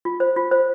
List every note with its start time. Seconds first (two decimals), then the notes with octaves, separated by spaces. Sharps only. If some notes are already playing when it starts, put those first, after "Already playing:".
0.05 F4
0.20 C5
0.36 F4
0.52 C5